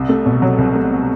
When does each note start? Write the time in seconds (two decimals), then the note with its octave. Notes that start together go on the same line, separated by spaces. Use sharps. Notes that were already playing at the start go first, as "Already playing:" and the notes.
Already playing: C2
0.09 A3
0.26 B2
0.42 F#3
0.58 C2
0.75 A3